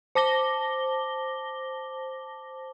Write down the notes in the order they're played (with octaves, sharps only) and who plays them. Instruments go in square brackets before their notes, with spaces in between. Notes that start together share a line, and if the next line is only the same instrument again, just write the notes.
[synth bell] C5 A5 D6 A#6 G7